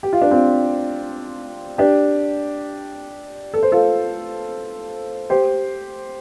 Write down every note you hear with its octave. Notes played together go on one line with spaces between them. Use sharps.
G4
F4
D4
C4 F4
D4 G4
A4
C5
F4 A4
G4 C5